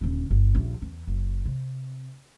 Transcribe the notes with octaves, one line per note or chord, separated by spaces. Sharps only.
D#1 D3
G1
A#1 D#2
E2
F#1
C3